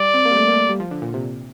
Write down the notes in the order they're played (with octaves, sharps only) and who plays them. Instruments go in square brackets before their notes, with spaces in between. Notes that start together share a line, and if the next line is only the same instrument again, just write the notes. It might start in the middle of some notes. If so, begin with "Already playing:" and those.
Already playing: [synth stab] G3 [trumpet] D5
[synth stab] C4
A#3
G3
A3
A#3
A3
A#3
G3
F3
D3
A#2
C3